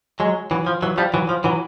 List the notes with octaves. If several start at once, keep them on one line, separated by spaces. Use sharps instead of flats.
F#3 G#3
E3 F#3
F3
E3 F#3
F3 G3
E3 F#3
F3
E3 F#3